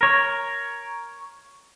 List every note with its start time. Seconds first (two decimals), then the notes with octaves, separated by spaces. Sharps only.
0.01 A#4 C#5